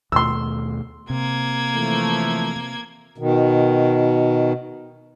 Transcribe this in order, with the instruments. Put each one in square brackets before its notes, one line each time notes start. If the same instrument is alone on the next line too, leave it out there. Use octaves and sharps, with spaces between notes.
[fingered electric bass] D#2 B2 A3 [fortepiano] C6 E6
[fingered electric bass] C3 [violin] A#3 G#6
[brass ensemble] E3 F3 A3
[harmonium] B2 D#3